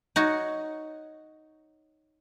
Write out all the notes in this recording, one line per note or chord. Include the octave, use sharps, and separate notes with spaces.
D#4 F#4 C#5